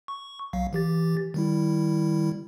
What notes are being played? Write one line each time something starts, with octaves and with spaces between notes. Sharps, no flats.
C#6
B1 F#3 F5
E3 G4 A6
D#3 G3 E4